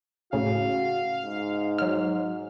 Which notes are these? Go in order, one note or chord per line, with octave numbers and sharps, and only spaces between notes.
A2 C#3 F#4 F5
G#2
F#3 F6